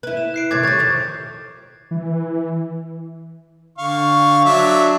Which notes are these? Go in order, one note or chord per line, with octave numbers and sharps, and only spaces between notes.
E4 B4
E7
F#6 C7 D7
A2 C3 D#3 D6 G#6 A6
G3 C#5 G6 A6
F2 D#3
E3
D3 F5 C#6
F#3 D4 E5